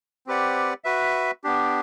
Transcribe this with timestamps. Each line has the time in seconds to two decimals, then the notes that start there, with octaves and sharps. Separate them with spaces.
0.27 C4 G4 B4 D5 F#5
0.84 F#4 B4 E5
1.44 B3 D4 G4